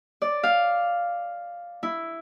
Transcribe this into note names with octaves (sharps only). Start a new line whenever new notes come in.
D5
F5
E4